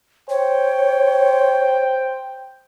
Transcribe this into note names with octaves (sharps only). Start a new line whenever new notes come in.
C5 C#5 G5